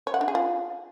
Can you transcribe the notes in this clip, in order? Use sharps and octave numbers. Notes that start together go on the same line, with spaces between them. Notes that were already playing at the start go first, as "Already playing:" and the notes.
C#5
F#5
D4
G#4
F4